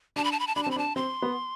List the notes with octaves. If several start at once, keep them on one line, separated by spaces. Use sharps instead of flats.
D4 A5
B5
A5
B5
A5
D4 B5
A5
C4 B5
D4 A5
C4 C6
B3